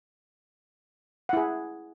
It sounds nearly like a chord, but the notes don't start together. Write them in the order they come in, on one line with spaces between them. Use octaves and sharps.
F#5 E4 G#4